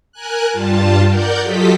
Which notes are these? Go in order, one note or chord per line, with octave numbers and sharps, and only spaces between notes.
A#4 G#5 F#6
G2 G3 F4 A5
A#4 D5 F#5 G6
F#3 F4 G4 A4 D#5 B6